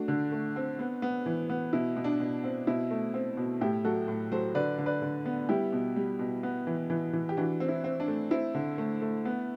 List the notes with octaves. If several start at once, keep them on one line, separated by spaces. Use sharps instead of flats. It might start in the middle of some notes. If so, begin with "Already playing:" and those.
Already playing: A3 D4 F#4
D3
A3
C4
B3
B3
E3
B3
B2 E4
B2
D4
B2
C4
B2 E4
A3
C4
B2
A2 E4 G4
F#3 F#4 A4
A2
F#3 A4 C5
D3 B4 D5
D3
B4 D5
D3
B3
G3 E4 G4
B2
G3
B2
B3
E3
E3
E3
G4
E3 D4 F#4
C4
E4
C4
D4
A3
C4 E4
D3
A3
A3
B3